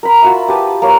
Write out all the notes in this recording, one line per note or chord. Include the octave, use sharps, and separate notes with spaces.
A#4 B5
F4 F#4 E5
G4 B4 A5 D#6
A#3 C#5